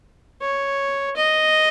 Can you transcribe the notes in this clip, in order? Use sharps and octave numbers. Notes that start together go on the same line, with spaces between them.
C#5
D#5